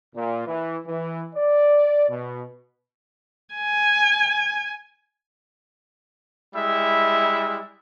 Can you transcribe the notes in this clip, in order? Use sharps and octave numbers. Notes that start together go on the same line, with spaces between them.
A#2
E3
E3
D5
B2
G#5
G3 G#3 E4 E5